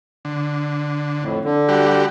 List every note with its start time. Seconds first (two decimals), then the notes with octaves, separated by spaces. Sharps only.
0.25 D3
1.23 F2 A2
1.44 D3
1.69 G3 F#4 G4